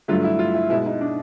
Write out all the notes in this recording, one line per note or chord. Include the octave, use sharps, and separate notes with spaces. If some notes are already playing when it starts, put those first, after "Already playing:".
G2 D3 F#3 A3 F4
E4
F4
E4
B2 G#3 E4
D#4
D4